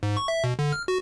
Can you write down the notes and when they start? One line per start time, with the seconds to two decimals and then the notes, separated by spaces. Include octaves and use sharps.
0.03 G#2
0.17 C#6
0.28 E5
0.44 B2
0.59 D3
0.72 F6
0.88 F#4